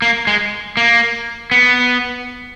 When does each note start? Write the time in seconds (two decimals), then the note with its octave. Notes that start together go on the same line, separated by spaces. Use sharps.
0.02 A#3
0.27 G#3
0.77 A#3
1.51 B3